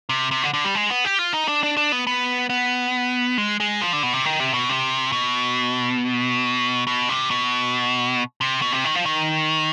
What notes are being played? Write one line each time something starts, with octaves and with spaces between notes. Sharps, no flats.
C3
C3
D3
D3
G3
G#3
B3
G4
F4
D#4
D4
D4
D4
B3
B3
B3
G#3
G#3
F3
D3
B2
C3
D#3
C3
B2
C3
B2
B2
C3
B2
C3
B2
C3
D#3
F3
D#3